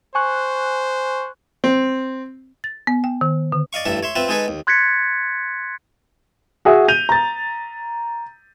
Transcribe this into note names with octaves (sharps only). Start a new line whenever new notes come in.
C5 G#5 C#6 F#6
C4
A6
B3
G5
D#3
D3
D5 D#5 F5 C#6
A1 G2 D4 A4 E5
C#5 E5 C6
C4 F4 B4 E5
G#3 D#4 G#4 A4 B4 G#5
D#2
C6 F#6 G#6 A6 B6 C#7
F#4 G#4 E5 G#5
G6 D#7 F7
A#5 A6